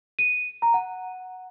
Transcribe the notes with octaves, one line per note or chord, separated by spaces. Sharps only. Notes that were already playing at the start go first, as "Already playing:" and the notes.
D#7
A#5
F#5